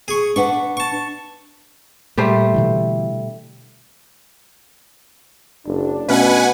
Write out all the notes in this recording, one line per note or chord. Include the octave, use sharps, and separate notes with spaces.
G#4 C#6
D4 B4 F#5 C#6
A5 C#6
A#2 G3 A3 C5
B2 D3 E3
F#1 D4
B2 A3 C#4 B4 F#5 G#5